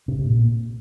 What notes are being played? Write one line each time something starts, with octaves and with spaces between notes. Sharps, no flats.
C3
C3
A#2